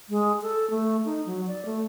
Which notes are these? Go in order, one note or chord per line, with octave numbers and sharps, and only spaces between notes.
G#3
A4
A3
D#4
F#3
D5
A3